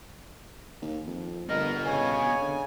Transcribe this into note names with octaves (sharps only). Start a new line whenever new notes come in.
D#2
F2
G1 B3 A#4 D#5
C#3 C#5 G#5
D3